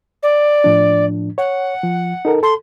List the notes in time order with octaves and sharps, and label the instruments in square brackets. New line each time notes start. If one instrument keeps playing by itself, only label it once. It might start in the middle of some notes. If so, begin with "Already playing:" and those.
[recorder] D5
[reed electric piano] A2 F3 D4
[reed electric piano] C#5 [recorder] F#5
[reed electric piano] F3
D#4 A4 A#4
[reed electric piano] A4 [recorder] C6